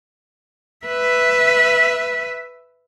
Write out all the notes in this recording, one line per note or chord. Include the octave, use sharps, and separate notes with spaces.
B4 E5